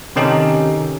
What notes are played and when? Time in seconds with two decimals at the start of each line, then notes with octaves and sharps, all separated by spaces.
0.16 C3 D#3 C#4 D#4 G4 A4